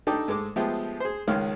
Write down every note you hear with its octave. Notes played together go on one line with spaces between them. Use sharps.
D4 D#4 G4 A4 D5 G5
G#2 G#3 A4 D6
F3 G#3 A3 B3 G4
G#4 C5
C#2 D#3 G#3 C#4 F5